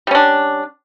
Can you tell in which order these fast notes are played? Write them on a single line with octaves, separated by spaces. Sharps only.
G3 C#4 D4